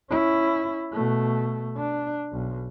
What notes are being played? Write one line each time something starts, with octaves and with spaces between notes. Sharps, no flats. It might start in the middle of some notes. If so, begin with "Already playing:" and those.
C#4 E4
B2 A3
D4
B1